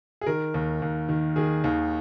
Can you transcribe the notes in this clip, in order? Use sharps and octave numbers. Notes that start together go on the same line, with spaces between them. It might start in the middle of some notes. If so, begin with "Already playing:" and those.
G#4
D#3 A#4
D#2
D#2
D#3
D#3 G#4
D#2